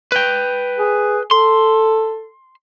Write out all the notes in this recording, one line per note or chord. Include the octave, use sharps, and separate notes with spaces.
B4 G5
G#4
A4 C6